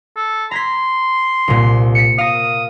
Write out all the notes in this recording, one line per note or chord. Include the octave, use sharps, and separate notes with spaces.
A4
A#5 C6 G#6 B6
C2 A#2
B6 C#7
A#4 F5 D#6